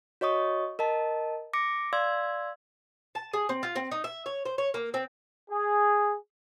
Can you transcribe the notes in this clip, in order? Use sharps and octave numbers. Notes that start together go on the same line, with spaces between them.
F#4 C#5 D#5 C#6 D#6
A#4 D#5 A5
D6 A#6 C#7 D7
D5 F5 C6 E6 G#6
A5
G#4
C4
F4
C4
D#4
E5
C#5
C5
C#5
A#3
C4
G#4